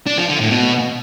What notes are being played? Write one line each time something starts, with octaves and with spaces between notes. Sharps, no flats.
D4
F3
D3
A2
B2